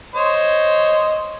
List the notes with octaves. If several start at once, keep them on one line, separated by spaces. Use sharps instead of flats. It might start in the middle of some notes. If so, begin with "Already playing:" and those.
C5 C#5 D#5